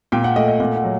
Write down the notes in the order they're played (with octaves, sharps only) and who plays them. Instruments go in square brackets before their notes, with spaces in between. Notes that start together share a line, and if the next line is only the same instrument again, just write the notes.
[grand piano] A#2 G5
F#5
A3 D#5
D#5
A#2 F#5
F#5
F#3